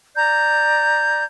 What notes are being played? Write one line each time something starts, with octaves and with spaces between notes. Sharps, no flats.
D5 A#5 G6